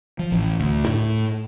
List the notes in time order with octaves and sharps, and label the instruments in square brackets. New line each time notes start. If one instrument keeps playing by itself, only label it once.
[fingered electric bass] F3
A1
D2
A2